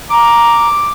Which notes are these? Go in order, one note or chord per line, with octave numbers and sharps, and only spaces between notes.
A#5 D6